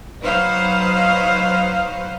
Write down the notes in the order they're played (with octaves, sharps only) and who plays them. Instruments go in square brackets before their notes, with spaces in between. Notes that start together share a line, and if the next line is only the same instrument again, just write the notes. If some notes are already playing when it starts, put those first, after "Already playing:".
[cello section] F#3 D#4 B4 C5 F5